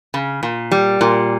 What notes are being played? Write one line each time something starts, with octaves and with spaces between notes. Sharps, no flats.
C#3
A#2
G3
A#2